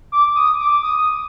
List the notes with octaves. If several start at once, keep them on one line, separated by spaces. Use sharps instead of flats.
D6
D#6
D6
D#6